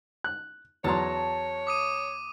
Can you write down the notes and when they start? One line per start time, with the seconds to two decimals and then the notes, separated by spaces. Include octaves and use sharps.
0.24 F#6
0.84 E2 F#3 C#5 A5 A#5 C6
1.67 D6 D#6 D#7